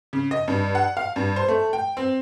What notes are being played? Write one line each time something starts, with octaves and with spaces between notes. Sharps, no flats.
C#3
D#5
G2
F#5
F5
G2
C5
A3
G5
C4